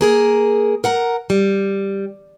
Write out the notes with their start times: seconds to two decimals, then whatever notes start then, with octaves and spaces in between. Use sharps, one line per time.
0.01 A#3 G#4 A#4
0.84 A#4 F#5 A#5
1.30 G3